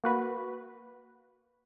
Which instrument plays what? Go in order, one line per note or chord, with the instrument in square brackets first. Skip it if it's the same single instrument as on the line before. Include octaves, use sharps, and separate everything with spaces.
[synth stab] A#3 F#4 B4